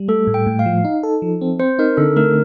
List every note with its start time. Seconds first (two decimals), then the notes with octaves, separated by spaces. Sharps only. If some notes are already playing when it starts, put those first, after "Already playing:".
Already playing: G3
0.08 A3 A4
0.27 A2
0.34 G5
0.47 A2
0.59 F5
0.66 F3
0.85 D#4
1.03 A4
1.22 F3
1.41 C4
1.59 C4 C5
1.79 D#4 A#4
1.97 D3 A4
2.16 A3 A#4